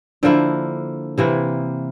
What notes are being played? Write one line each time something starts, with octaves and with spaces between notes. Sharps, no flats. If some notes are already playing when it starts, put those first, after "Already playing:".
D3 F3 A#3 E4
C3 E3 A#3 E4